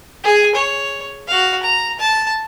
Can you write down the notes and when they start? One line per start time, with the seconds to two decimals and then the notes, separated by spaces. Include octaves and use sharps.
0.24 G#4 G#5
0.55 C#5
1.27 F#4 F5
1.63 A#5
1.99 A5